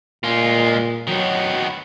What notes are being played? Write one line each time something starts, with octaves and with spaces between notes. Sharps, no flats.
A#2 G#3 F4
D#3 F#3 B3